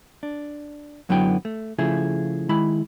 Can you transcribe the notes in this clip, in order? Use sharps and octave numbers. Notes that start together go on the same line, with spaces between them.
D4
F#2 D3 F#3 B3 E4 G5
A3
C#3 F3 A3 E4 G#4
D#3 G#3 E4 B5